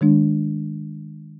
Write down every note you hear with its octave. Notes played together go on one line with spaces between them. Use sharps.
D#3 G#3 D4